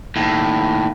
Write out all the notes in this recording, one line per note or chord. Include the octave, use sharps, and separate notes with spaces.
D#2 A2